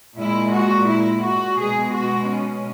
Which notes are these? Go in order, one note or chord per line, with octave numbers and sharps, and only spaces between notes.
A#2 G#3 E4
F#4
E4
F#4
B2 G#3 G#4
F#4
C#4